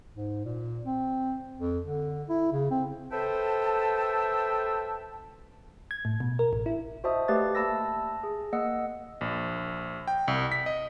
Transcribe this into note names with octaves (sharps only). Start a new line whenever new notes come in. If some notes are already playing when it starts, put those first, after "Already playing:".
G#2
A#2
C4
F2
D3
E4
C#3
C4
A4 B4 C5 E5 G5 A5
G#6
A2
B2
A#4
A1
E4
F#4 C5 D#5 E5 A5 D#6
A3 G4 B4 D5 F5 A6
A#3 E5 A5 B5 E6 A#6
G#4
A#3 D#5 F#5 E6
A#1
G5
C2
B6
D#5